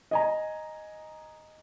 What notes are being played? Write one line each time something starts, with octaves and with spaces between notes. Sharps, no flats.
D#5 G#5 A#5